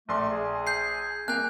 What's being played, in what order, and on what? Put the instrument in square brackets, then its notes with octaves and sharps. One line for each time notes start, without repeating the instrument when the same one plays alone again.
[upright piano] A#1 D5 C6 [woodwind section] A3
[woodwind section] G#4
[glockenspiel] G6 C7
[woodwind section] E3 G3 C4 [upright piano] A#3 [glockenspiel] G#5 F#6